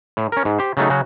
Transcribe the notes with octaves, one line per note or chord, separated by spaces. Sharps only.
A2
C#4 A#4
G#2
G4 C5
C#3 F#3 A3 D#4
C#3 F#3 F#4